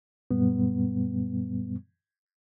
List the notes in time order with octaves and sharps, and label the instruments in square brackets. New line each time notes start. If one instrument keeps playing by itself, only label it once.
[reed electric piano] F#2 A#2 G3 B3